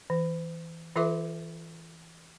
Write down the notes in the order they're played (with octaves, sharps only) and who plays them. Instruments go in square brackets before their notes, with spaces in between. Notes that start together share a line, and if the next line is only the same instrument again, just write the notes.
[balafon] E3
E3 F4 A4 B4 E5 D6